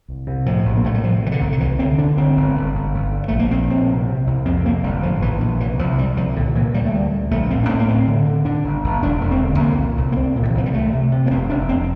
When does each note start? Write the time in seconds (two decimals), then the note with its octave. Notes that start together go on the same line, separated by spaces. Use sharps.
0.08 C2
0.27 C3
0.46 A2 F3
0.65 A#1
0.77 A#3
0.84 A2 A3
0.94 G3
1.03 C3 F3
1.23 C3 E3
1.32 D3
1.41 C2
1.52 D3
1.60 D2 E3
1.79 D3 C4
1.98 D3 D4
2.17 G1 C4
2.37 G1
2.55 G1
2.74 G1
2.94 G1
3.13 D3
3.28 A#1 A3
3.39 A#3
3.51 A#1 C4
3.70 A#1 C4
3.89 C3
4.08 C3
4.27 C2
4.45 F2 C4
4.65 C3 A#3
4.83 G1 G3
5.03 A2 F3
5.22 A#1 E3
5.41 A#1 E3
5.60 C3 E3
5.79 C2 F3
5.98 C3 G3
6.16 C2 F3
6.36 A#2 D3
6.55 A#2 E3
6.74 D2 G3
6.85 A3
6.93 D2 G3
7.12 D2
7.31 A#1 A3
7.50 A2 C4
7.63 D4
7.69 A2 C4
7.79 A#3
7.88 D2 C4
8.07 D3
8.26 D3
8.45 D3 D4
8.64 G1
8.84 G1
9.02 E1 D4
9.21 E1
9.31 C4
9.40 D3
9.59 C2 A#3
9.78 A#2
9.97 C2
10.12 A#3
10.16 C2 C4
10.36 A#2
10.43 D3
10.50 E3
10.55 C2 F3
10.66 G3
10.73 C3 A3
10.93 C3
11.12 C3
11.26 A#3
11.31 F1 C4
11.50 F1 D4
11.69 F1 C4